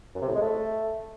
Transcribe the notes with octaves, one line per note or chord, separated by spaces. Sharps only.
F#2
C3
A2
G#3
A3